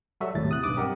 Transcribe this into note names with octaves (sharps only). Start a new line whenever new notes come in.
F#3 G3 F#4 A4 E5
G#1 D#2 A2 A6
C3 D#6 F#6
B1 G2 D6 D#6
C4 G4 A#4 D#5 F#5